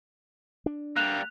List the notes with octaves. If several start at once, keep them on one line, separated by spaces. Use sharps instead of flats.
D4
G3 A#3 F#6 F7